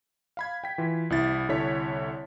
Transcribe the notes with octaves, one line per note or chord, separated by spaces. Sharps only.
F5 B5 G#6
G5 B6
E3 F4
C2 E4 A6
C2 D3 E4 C#5 B6